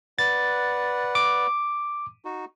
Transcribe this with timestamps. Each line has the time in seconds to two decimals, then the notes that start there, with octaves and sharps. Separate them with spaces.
0.19 B4 D5 F#5 A6
1.15 D6
2.25 D#4 F#4